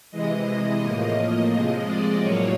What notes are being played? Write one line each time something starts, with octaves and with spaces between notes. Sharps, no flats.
C3 E3 G#3 D#5
A2 F3 A#3
C3 F3 G#3 D#5
D5
A2 F#3 A#3 C#5